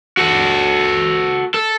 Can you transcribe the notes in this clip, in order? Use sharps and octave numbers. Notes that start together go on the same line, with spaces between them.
F#4 A4
A4